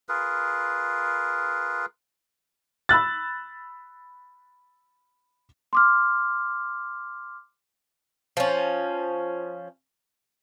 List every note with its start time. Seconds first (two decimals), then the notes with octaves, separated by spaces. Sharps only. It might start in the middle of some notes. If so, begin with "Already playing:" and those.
0.09 F4 G#4 A#4 B4
2.89 B5 E6 F#6 A6
5.73 C6 D6 F6
8.37 F3 C#4